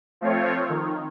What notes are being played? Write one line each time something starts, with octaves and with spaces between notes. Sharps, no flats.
F3 A3 C4 F4 C#5
D#3